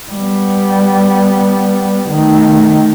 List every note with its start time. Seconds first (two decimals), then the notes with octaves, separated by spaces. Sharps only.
0.12 G3 B3
2.09 D#3 A3